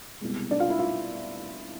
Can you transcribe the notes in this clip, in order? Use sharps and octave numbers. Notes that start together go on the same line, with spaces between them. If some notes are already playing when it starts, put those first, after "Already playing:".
C2 B2 G#3
D4 D5
F4 F5
E4 E5
F4 F5